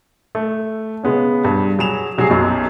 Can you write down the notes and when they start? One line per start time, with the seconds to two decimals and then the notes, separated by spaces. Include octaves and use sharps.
0.35 A3
1.03 C#3 G#3 B3 C#4
1.44 G2
1.79 F#3 G#4 E7 F7
2.18 C3 F#3 G3 G#4 C7
2.30 B1 F#2